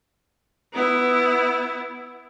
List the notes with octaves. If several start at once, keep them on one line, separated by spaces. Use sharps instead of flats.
B3 E4